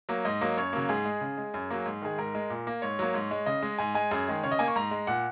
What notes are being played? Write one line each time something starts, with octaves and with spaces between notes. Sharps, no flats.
F#3 A#3
G#2 D#5
F#3 A#3
F#2 C#5
C#3 F#3 A#3
G#2 G#4
G#3
C#3
G#3
F#2
F#3 A#3
G#2
D#3 G#3 G#4
G#2 A#4
G#3
A#2
A#3
G#2 C#5
F#3 A#3
G#2
G#3
C#3 D#5
G#3
G#2 G#5
G#3 G#5
F#2 G#4
D#3 G#3
C#3 C#5
D#5
A#3 G#5
C#6
G#2 A#5
G#3
A#2 F#5